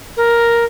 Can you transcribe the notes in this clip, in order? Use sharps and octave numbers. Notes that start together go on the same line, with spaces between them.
A#4